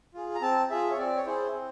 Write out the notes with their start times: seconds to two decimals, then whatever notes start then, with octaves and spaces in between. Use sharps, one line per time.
0.14 F4 G#4
0.35 A#5
0.41 C4 A5
0.70 F4 G#4 E5
0.91 C#5
0.98 C4 D5
1.17 C#5
1.26 E4 G#4 C5
1.53 C4